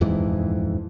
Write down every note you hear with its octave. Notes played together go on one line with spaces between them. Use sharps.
D#1 F2 G#2 E3